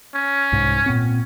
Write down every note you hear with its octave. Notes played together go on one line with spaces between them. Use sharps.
C#4
C2 G#2
A#2 B3 C4